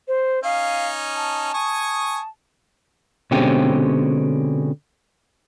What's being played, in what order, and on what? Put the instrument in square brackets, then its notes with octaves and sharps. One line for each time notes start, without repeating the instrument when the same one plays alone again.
[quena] C5
[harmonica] C#4 D#4 [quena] F5
[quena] A5
[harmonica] G#5 C#6 D#6
[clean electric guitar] B2 D3 G#3 C4 C#4 G4